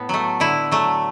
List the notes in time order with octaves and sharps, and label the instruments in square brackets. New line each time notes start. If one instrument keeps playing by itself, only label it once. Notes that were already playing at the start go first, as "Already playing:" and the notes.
Already playing: [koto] A2 B3
F#3 A3
D3 E4
F#3 A3